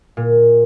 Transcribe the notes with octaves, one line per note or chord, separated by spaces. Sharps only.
A#2